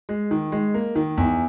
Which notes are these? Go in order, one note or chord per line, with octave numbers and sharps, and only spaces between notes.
G#3
D#3
G#3
A#3
D#3
E2